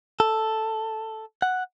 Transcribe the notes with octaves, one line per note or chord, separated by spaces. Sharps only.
A4
F#5